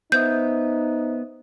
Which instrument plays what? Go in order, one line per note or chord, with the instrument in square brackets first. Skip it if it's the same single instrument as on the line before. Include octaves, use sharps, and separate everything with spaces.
[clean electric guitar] B3 [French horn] D#4 [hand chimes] C5 E5 D#6 [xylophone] G6